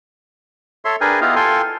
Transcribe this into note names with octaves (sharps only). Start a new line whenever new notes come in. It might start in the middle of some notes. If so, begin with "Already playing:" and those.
A4 C#5 E5 C6
D4 G#4 A#4 B4 G5 G#5
B3 E4 F4 G4 D#5 F5
F4 A4 G5 G#5 C6